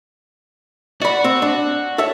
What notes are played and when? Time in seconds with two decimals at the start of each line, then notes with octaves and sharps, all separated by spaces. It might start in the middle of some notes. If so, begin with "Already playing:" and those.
1.02 F#4 D5 B5
1.24 C4
1.42 D4
1.98 A4 C#5 E5